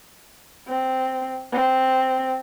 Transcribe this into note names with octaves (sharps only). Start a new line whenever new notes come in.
C4
C4